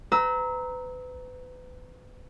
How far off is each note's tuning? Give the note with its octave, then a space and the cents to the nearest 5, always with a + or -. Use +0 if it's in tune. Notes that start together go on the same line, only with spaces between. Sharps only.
B4 +35 A#5 +0 E6 -30